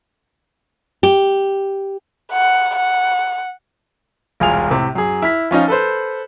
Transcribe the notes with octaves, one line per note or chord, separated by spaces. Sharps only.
G4
F#5
F#5
E1 C2 F4 G#4 G#5 F7
A2 C3
F#2 G#4
E4 F6 B6
F3 C#4 D#4 F4
A4 B4 C5